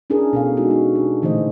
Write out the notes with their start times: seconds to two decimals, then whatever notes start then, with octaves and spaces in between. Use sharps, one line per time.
0.10 C#4 D4 E4 G#4 A#4
0.33 B2 A4 F5
0.57 G#3 D#4 F#4
0.70 D4 F#4
0.95 D4
1.22 A#2 D3 E3 A3 C5 D#5